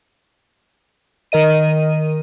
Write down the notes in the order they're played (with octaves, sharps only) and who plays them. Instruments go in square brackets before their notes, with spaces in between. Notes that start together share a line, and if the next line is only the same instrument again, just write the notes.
[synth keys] D#3 A#4 D#5 D#7